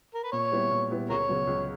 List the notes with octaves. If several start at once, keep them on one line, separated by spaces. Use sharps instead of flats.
A#4
B4
A#2 C#5
G3 B3 E4
A#2
G3 B3 E4
C#2 A#4 C#5
C#3 F#3 B3
C#2